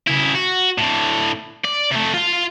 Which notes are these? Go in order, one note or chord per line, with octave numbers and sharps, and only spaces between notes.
C#3 E4
F#4
A2 D3
D5
C3 A3
F4 C6